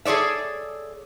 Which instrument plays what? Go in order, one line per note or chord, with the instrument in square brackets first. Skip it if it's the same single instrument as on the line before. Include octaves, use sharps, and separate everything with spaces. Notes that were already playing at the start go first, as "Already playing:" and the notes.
[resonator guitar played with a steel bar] G#4 A4 C#5 D5 E5